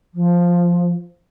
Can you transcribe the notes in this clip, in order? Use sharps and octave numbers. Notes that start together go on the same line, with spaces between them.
F3